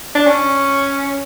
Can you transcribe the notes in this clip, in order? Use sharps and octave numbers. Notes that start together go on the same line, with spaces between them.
D4
C#4